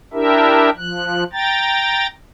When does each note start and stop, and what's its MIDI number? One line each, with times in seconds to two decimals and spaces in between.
0.13 0.70 62
0.13 0.70 64
0.13 0.70 67
0.13 0.70 70
0.13 0.70 76
0.77 1.24 53
0.77 1.24 90
1.33 2.07 79
1.33 2.07 82
1.33 2.07 93